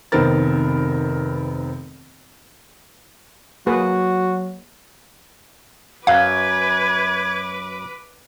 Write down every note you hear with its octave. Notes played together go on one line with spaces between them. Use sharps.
F1 D#3 B3 C4 A#4 A6
F#3 A#3 F#4 G#4 B4
F#2 F#3 B4 F5 D6 G#6